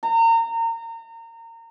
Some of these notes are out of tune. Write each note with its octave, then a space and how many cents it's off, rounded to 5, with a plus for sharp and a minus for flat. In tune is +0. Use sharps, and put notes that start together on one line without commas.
A#5 -30